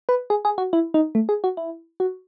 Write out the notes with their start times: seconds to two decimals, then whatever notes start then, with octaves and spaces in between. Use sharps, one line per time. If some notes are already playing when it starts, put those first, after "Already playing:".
0.09 B4
0.30 G#4
0.45 G#4
0.58 F#4
0.73 E4
0.94 D#4
1.15 A3
1.29 G#4
1.44 F#4
1.57 E4
2.00 F#4